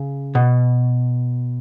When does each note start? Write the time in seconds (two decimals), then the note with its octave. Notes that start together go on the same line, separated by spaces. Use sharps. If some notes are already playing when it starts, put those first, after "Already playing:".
Already playing: C#3
0.35 B2